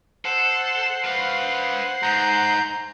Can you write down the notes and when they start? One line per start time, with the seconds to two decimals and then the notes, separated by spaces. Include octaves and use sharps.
0.25 A4 C5 F#5
1.04 B4 F5
2.03 G#2 A#5 G6